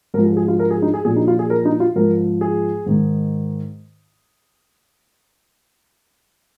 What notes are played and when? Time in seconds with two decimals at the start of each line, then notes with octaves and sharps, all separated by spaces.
0.14 G#2 A#4
0.18 F3
0.26 G#4
0.37 G#4
0.48 F4
0.59 A#4
0.71 G#4
0.82 D#4
0.94 G#4
1.05 A#2 F3 G#4
1.16 D#4
1.28 F4
1.39 G#4
1.50 A#4
1.65 D#4
1.80 F4
1.95 G#2 F3 A#4
2.41 G#4
2.86 G#2 D#3